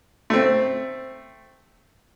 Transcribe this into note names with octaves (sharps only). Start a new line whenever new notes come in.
A3 C4